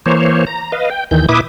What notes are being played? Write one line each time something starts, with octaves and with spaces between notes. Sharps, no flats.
E3 A#3 C5 C#5
A#5
B4 D#5 F5
G5
D#2 D#3 E3 G6
A#2 E4 B4 E5 D6 D#6